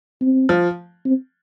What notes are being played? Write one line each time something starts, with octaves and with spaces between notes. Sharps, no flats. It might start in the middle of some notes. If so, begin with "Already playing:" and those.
C4
F3
C4